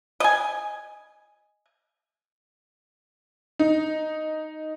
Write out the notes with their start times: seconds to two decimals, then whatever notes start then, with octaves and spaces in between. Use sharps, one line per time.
0.20 D#5 G#5
3.59 D#4